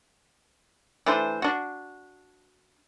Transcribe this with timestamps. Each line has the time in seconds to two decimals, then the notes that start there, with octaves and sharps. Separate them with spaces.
1.06 E3 A3 D4 C5
1.42 D4 F#4